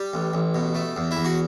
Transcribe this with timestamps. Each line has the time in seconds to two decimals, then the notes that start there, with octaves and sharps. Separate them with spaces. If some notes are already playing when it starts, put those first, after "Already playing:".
Already playing: G3 G4
0.14 A1
0.34 A1
0.54 B2
0.75 A3
0.96 E2
1.11 E4
1.17 E2
1.25 F#4